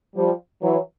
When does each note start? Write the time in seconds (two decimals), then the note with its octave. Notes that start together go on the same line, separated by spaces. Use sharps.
0.16 F3 G3
0.62 E3 F#3